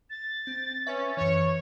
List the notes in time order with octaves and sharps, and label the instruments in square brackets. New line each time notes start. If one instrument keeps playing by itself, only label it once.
[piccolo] A6
[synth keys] C4
[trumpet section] C#4 [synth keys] B4 E5
[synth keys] F#2 E3 [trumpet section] C#5 [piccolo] C#6